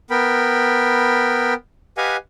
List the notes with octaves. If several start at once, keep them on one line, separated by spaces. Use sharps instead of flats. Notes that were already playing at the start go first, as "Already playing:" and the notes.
B3 A#4 G5 B5
G4 B4 D#5 F5 F#5 G#5